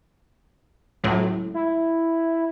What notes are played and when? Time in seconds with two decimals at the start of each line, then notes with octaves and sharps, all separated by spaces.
1.04 C#2 A2 F#3
1.54 E4